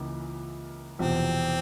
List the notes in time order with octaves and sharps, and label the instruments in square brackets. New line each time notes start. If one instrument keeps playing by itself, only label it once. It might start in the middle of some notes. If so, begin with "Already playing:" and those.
Already playing: [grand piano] C#2 C#3 E3 A#3
[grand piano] E1 E2 C3 F3 [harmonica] C4